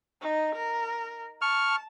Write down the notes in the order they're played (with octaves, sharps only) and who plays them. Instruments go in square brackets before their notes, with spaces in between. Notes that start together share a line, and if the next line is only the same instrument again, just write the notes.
[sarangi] D#4
A#4
[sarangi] A5 [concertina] C#6 F6